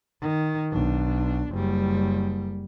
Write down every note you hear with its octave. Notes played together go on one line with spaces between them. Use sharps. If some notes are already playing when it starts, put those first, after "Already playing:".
D#3
B1 D4
F#1 G3